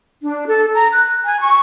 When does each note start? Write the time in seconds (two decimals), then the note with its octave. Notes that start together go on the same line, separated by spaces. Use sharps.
0.22 D4
0.47 A4
0.74 A#5
0.93 F#6
1.24 G#5
1.41 C#6